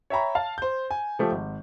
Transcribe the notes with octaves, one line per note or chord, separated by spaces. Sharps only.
C#5 E5 G5 A#5 B5
F5 A5
C5 G6
G#5
F3 A3 G4
G#1